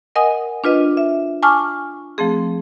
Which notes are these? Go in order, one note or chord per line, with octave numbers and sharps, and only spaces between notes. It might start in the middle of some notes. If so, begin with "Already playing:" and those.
A#4 D#5 F#5 G#5 D#6
D4 F4 B4 D#5
E5
G#5 A5 C#6 D6 F6
F3 A3 C4 G#4